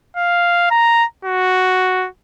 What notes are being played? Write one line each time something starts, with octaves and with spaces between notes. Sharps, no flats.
F5
A#5
F#4